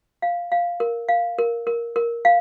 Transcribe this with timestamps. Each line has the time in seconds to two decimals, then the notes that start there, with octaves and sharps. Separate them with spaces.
0.22 F5
0.52 F5
0.80 A#4
1.09 F5
1.39 A#4
1.67 A#4
1.96 A#4
2.25 F5